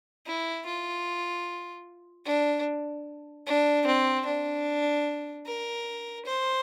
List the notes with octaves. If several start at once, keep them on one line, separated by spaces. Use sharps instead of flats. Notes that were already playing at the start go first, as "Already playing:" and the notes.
E4
F4
D4
D4
C4
D4
A#4
C5